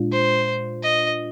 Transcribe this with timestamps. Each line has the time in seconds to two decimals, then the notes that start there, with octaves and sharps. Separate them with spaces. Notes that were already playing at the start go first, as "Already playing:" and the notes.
Already playing: A#2 G#3 D4 F4
0.12 C5
0.83 D#5